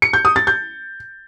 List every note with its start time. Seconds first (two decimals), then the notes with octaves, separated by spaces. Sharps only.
0.02 C#7
0.13 G6
0.25 D#6
0.36 A6
0.47 G6